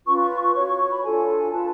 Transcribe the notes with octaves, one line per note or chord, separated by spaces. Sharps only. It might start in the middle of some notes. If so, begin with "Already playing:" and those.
C#4 F4 B4 C#6
C#6
C#6
C#6
F#4 C#5 C#6
C#6
C#6
B5
D4 F4 A4 G#5
F4 B4 A5